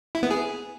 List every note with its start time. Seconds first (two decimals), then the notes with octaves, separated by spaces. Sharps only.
0.15 E4
0.23 B3
0.31 G#4